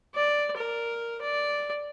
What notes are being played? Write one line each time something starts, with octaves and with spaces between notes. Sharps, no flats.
D5
A#4
D5